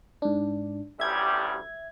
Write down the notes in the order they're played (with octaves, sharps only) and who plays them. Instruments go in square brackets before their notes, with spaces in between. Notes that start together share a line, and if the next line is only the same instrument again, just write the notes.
[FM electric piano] G#2 D4
[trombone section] A1 D2 G3 [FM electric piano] E5 G#6